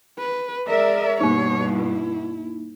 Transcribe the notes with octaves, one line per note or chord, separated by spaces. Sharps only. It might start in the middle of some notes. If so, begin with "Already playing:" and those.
B4
G#3 A#4 D5 E5
G2 B2 A#3 D#4 C#5
E4